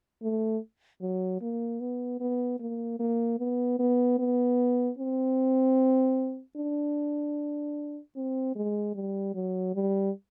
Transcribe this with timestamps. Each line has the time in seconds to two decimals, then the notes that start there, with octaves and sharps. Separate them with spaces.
0.22 A3
1.01 F#3
1.41 A#3
1.80 B3
2.20 B3
2.60 A#3
2.99 A#3
3.39 B3
3.79 B3
4.19 B3
4.98 C4
6.57 D4
8.16 C4
8.56 G#3
8.95 G3
9.34 F#3
9.75 G3